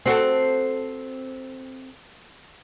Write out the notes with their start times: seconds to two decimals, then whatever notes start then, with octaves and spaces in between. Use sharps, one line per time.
0.06 C4 F#4 A4